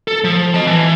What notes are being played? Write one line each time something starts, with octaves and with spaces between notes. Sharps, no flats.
A4
F3
D#5 A5
E3